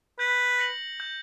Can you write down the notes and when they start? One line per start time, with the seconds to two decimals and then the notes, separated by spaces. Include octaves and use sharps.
0.19 B4 G6
0.59 A#6 C#7 F#7
1.00 G6